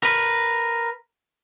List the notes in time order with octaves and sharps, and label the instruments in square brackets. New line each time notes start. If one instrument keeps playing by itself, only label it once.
[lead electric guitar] A#4 B4